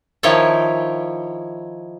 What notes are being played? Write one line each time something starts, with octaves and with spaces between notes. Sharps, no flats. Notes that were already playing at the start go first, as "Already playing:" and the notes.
D#3 F3 E4 C#5 G5 A5